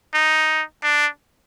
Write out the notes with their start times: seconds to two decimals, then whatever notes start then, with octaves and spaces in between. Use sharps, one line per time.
0.14 D#4
0.83 D4